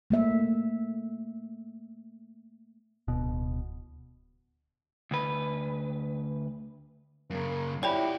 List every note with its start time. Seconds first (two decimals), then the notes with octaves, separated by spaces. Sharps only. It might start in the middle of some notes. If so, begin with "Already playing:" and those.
0.10 A3 A#3 E5
3.08 D1 B2
5.11 D2 B4
7.30 F#2 C#3 A#3
7.83 E4 F#4 G4 C#5 D5 G5 B5